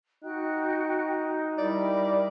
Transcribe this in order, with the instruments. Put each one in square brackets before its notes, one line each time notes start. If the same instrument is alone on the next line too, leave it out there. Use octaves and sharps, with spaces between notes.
[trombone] D#4 [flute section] F#4 G5 F#6
[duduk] G3 [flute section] E4 A#4 [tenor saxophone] D5